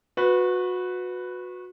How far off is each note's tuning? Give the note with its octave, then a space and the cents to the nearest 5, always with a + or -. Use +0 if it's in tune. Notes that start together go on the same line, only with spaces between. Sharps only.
F#4 -25 B4 +5